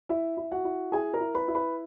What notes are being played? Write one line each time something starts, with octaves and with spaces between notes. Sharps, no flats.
E4 E5
E4
F#4 F#5
E4
E4 G#4 G#5
A#4 A#5
E4
B4 B5
E4
B4 B5